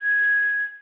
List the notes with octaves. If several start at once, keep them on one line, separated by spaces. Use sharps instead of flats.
G#6